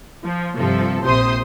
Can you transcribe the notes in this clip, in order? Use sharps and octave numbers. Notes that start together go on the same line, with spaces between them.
F3
G2 C3 F3 A4
A#1 C3 C5 C6 D#6